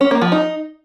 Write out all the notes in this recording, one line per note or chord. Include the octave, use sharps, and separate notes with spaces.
C#4
A#3
F3
D#4